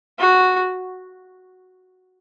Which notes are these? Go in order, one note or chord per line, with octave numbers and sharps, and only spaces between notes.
F#4